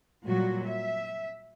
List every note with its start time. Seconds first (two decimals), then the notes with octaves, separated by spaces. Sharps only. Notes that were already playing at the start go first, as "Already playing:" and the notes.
0.24 A#2 F#3 G3 F#4
0.65 E5